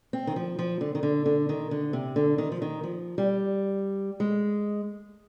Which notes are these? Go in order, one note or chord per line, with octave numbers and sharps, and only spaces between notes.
C4
D#3
F3
F3
D3
D#3
D3
D3
D#3
D3
C3
D3
D#3
F3
D#3
F3
G3
G#3